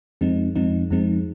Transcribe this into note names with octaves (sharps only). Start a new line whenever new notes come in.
F2 F3 G#3 C4 D#4
F2 F3 G#3 C4 D#4
F2 F3 G#3 C4 D#4